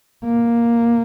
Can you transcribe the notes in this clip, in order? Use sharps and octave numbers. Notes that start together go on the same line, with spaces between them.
A#3